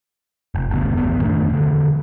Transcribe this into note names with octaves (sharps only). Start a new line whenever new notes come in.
F1
F#1 D2 B2
A1 D#2 B3
F#2 D#3 A3 D4
E1 D3